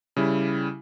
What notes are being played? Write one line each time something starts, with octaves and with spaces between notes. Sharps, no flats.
C#3 G3 E4